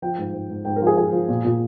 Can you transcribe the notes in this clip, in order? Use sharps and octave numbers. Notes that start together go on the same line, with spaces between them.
F3 G5
G#2
G#2
G#2
G#2 G5
A#4
F3 G#4
F3 G#4
F3
A#2
A#2